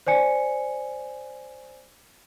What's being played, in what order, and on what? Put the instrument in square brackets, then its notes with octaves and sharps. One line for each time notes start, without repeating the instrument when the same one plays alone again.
[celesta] C5 D5 G#5 C#7